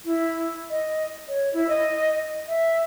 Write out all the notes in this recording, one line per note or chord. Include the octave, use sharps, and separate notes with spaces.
E4
D#5
C#5
E4
D#5
E5